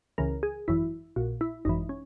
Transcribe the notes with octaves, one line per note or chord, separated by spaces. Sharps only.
C#2 C#3 E3 A#4
G#4
G#1 F#2 E3 E4
A#1 A#2 F#4
E4
G#1 F#2 E3 D#4
C#4